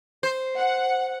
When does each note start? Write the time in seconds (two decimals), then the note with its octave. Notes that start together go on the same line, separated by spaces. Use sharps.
0.23 C5
0.57 F#5